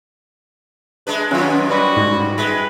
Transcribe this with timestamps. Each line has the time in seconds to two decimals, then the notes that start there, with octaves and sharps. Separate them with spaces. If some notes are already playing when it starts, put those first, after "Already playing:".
1.07 G#3 D4 B4
1.31 F#2 B2 D#3 F#3 C#4 F4
1.70 G3 F#4 B4
1.96 G#2
2.38 G#3 B4